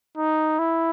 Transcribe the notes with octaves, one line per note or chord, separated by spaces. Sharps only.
D#4
E4